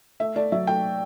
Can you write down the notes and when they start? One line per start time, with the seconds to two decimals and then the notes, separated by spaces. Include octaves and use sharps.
0.20 A3 E5
0.36 A3 D5
0.52 F#3 E5
0.67 A3 G5